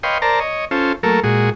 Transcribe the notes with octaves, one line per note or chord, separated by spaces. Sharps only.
B4 C#5 D#5 F5 G5 C6
A#4 C5 D5 A5 A#5
C#5 D#5
C#4 F4 A4 C5
F#3 A3 A#3 A4 A#4
A#2 G#3 F#4 G#4